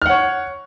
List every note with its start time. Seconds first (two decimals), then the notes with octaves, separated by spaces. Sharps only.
0.02 F6
0.06 F#5
0.10 C#5